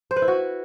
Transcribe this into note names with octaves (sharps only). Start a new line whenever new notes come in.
C5
B4
E4
F#4